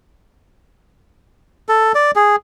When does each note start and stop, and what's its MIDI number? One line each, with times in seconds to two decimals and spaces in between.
1.69 1.92 69
1.95 2.11 74
2.16 2.36 68